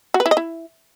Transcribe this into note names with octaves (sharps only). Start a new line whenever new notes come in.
F#4
B4
E4
D#5
E4